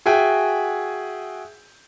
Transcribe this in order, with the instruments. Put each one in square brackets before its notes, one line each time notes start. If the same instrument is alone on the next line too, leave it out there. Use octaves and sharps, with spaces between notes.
[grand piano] F#4 G#4 E5 G5 G#5